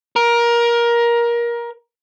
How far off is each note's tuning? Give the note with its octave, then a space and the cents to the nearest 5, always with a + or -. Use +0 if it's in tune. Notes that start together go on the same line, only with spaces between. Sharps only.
A#4 +20